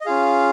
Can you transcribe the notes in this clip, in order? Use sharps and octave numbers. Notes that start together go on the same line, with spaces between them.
D#5
C#4 F4 G#4 F5